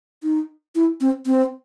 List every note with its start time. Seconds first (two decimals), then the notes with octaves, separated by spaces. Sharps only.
0.23 D#4
0.75 E4
1.01 C4
1.26 C4